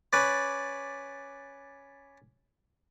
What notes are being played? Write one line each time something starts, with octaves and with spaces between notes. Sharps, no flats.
C#4 B4 D5